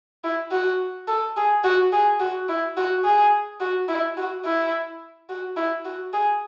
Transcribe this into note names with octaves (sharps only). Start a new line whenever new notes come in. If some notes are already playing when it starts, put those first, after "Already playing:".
E4
F#4
A4
G#4
F#4
G#4
F#4
E4
F#4
G#4
F#4
E4
F#4
E4
F#4
E4
F#4
G#4